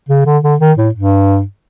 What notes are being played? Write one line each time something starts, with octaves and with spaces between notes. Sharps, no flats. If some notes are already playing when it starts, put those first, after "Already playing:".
C#3
D3
D3
D#3
A2
G2